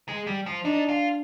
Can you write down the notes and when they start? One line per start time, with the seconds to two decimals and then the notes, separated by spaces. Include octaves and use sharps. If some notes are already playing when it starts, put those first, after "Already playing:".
0.08 G#3
0.27 G3
0.46 F3
0.64 D4 D#4
0.89 F4